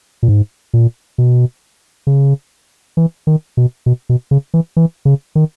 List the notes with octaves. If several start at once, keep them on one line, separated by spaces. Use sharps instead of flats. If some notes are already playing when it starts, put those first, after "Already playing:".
A#2
G#2
A#2
B2
C#3
E3
D#3
B2
B2
B2
C#3
E3
E3
C#3
D#3